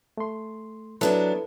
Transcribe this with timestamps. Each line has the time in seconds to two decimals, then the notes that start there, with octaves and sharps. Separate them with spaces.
0.17 A3 C6
1.01 F#3 B3 D4 E4 A4 B4